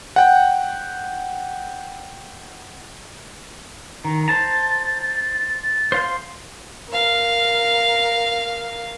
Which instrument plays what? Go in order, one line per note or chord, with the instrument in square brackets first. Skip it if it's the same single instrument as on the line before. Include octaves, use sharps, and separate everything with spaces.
[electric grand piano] F#5 G5
[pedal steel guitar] D#3 [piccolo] A#5
[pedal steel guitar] C5 A5 A#5 [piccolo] A6
[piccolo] A6
[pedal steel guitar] C5 F5 C6
[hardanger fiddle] A#4 F5